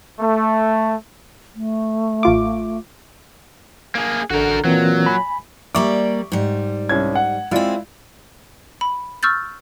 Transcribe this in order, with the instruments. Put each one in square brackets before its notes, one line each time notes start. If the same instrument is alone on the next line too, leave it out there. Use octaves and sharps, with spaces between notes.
[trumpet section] A3
[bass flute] A3
[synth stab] A1 F4 D6
[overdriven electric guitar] A#3 G#4
[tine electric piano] A1 [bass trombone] D3 [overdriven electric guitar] F#4 A#4
[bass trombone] A#2 [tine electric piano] E3 C4 [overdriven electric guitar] F#3
[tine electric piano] G#5 B5
[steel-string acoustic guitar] G3 A#3 D5 [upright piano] E5 C#6 D6
[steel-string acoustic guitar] G#2 G3
[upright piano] C2 C#4 G#6
F#5
[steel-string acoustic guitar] G#3 C4 [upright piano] E4 F4 D5
[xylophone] B5
C#6 E6 F6 G6 A6